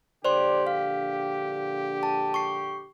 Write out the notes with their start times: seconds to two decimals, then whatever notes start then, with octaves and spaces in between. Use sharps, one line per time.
0.25 A#1 D3 G4 C5 D5 C6
0.67 F5
2.03 A5
2.34 C#6 C7